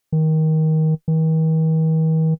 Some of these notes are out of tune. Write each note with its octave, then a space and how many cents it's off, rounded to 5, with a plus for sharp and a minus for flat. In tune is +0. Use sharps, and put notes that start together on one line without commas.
D#3 +20
D#3 +45